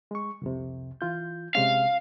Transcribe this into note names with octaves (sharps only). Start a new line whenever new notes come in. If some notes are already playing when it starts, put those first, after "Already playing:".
G#3 C#6
C2 F2 C3
E3 F4 G6
C3 G#3 C#4 F5